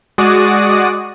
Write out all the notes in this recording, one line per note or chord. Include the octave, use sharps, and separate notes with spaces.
G#3 F#4 D5 D#6